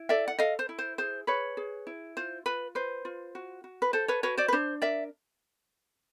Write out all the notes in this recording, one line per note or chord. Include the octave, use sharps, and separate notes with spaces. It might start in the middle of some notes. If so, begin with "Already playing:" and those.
Already playing: E4
A4 D5 E5
F#5
A4 D#5 F5
C5
E4
C5
G#4 C5
G#4 B4 C#5
G#4
E4
F4 C5
F4 B4
B4 C5
F4
F#4
F#4
B4
A4 C5
B4 C#5
F#4 B4 C#5
C5 D5
B4
D4 C5
A#4 D5 E5